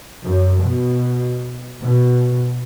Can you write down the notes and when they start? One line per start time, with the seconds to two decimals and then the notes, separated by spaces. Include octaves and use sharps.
0.22 F#2
0.61 B2
1.79 B2